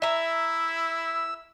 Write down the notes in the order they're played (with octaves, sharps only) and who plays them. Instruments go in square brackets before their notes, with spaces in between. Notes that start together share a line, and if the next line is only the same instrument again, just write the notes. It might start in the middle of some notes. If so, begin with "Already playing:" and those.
[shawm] E4 [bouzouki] E5 A#5 [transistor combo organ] E6